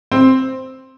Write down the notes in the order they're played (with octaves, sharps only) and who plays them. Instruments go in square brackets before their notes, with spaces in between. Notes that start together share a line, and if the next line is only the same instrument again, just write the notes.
[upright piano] C4